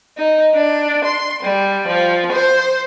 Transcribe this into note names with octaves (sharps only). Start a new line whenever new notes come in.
D#4
D4
C6
G3
F3
C5